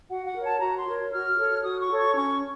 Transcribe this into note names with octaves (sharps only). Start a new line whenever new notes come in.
F#4 F#5
F#5
A#4 C#5
A5
F#4 A#5
C6
A#4 C#5
F#4 F6
A4 C#5
F#4 D#6
C#6
A4 C#5
C#6
C#4 C#6